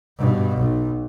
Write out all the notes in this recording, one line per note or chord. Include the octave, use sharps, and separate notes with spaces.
G2 B2
B1